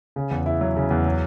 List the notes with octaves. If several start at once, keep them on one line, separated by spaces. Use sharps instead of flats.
C#3
E2
E4
F#3
C#3
E2
F#3